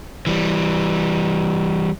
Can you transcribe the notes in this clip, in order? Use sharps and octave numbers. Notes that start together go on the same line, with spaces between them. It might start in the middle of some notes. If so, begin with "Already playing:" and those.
E3 G3